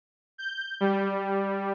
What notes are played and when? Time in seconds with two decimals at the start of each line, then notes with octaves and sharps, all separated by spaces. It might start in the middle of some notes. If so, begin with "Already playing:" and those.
0.38 G6
0.80 G3